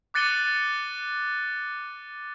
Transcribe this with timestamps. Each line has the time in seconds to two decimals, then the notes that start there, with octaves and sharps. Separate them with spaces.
0.14 D6 F#6 A6 C#7 D#7 G7